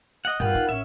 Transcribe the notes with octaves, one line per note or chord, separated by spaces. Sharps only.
D#5 F#5
G2 F4 A#4 B4 F#5 G5
D#4
A1 C#4 E5